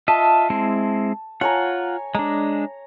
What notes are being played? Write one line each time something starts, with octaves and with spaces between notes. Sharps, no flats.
F4 D#5 E5 A5
G#3 C4 E4
F4 C#5 F#5 G#5 A#5
G#3 D4 A#5